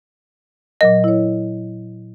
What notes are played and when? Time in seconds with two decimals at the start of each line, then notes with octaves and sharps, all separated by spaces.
0.81 A#2 F#3 A#4 D#5
1.04 E4 C#5